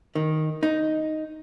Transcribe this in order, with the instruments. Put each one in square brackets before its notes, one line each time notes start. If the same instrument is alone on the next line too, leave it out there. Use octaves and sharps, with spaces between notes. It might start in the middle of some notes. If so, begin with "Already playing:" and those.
[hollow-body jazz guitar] D#3
D#4